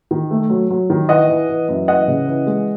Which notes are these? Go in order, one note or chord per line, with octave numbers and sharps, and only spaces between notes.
D#3
A3
F#3
F#3
D#3
E3 D#5 F#5
E3
E3
F#2
E3 D#5 F#5
C#3
E3
G#3